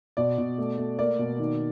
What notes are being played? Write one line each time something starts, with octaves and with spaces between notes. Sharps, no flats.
B2 D5
B2
A3
A3
A#3 D5
B2
D#3